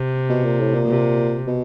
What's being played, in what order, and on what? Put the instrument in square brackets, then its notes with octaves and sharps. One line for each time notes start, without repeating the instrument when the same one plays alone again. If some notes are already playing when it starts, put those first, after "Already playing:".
Already playing: [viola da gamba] C3
[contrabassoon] B2
A#2
A2
A#2
[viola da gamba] C3
[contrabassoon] B2